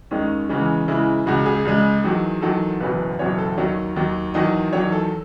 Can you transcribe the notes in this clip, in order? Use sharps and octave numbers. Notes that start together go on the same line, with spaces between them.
D#2 D#3 G#3 C#4
E2 C#3 E3 G#3 C#4
E2 C#3 E3 G#3 E4
C#2 C#3 G#3 F#4
G#4
C#2 C#3 G#3
E2 D#3 F#3
E2 D#3 F#3 A4
F#1 E2 B2 F#3 B4
F#1 E2 B2 F#3 C#5
A4
D#2 D#3 F#3 C#5
D#2 D#3 F#3
E2 D#3 F#3 D#5
E2 D#3 F#3 C#5
A4